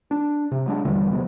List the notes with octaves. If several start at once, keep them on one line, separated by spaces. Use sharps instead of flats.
D4
C3
F#3 G#3 D4
D#2 D3 E3 G3
C3 F3 G#3 B3